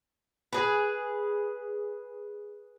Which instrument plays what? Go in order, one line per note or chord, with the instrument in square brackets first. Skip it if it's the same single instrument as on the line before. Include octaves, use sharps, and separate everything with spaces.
[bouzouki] G#4 B4